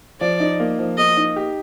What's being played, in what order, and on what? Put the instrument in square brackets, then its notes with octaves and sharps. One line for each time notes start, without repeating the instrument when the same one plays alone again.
[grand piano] F3 [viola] D5
[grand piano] D#4
A#3
F3
[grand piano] A#3 [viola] D#5
[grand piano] D#4
G4